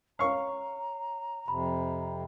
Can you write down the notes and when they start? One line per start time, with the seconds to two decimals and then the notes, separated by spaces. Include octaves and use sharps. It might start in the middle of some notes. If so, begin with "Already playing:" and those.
0.19 C#5 F5 A#5 C#6
1.48 F2 C3 B5